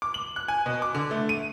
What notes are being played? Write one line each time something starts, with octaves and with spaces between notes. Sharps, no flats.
D6
F#7
F#6
G#5
B2
D6
D3
A3
D#7